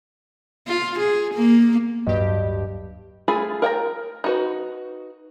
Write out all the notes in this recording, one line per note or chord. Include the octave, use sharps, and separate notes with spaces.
F4
G#4
A#3
D1 G2 F#3 G4 D#5
A3 F4 G#4 G#5 B5
A#4 F#5 G5 A#5
D#4 F#4 B4